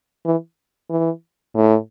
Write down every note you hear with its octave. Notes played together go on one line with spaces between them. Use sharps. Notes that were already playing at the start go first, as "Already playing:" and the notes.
E3
E3
A2